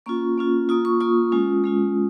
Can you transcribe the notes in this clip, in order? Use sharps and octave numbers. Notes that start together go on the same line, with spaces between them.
A#3 C#4 F4 C#6
A#3 C#4 F4
A#3 F4 D#6
C#6
A#3 F4 D#6
G#3 C#4 F4
G#3 C#4 F4